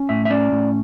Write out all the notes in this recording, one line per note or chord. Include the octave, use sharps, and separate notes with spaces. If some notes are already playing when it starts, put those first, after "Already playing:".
Already playing: C#4
A2 E5
E5
C#4 D5
A2